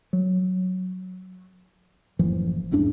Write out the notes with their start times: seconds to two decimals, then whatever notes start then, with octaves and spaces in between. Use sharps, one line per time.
0.13 F#3
2.19 F#1 A2 E3 F3
2.71 D#1 E2 G#2 D4